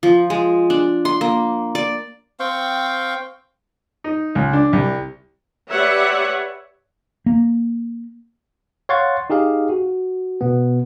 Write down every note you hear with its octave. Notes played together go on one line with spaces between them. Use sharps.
F3
G#3
D4
C6
A#3
D5
C4 F5 G5 C#6
D#4
C#2
D4
C2
G4 B4 C#5 D5 E5 F#5
A#3
C#5 F5 F#5 C6 C#6 A6
D#4 G4 G#4 F5
F#4
B2 B3